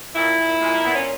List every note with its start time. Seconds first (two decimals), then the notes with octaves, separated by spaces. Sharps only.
0.15 A#2 E4
0.38 A#2
0.60 A#2 G#3
0.73 A#3
0.82 A#2 B3
0.94 C#4